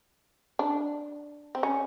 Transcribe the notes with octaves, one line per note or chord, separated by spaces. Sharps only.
D4
C4
C#4